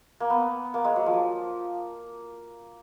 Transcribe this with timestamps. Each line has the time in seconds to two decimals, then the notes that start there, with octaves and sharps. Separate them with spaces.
0.20 A#3
0.30 B3
0.74 A#3
0.84 G#3
0.96 F#3
1.06 F3